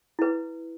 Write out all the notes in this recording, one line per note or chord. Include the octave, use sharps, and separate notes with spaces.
E4 B4